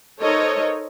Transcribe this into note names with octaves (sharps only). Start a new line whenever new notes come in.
D#4 A4 A#4 C5 C#5 D#5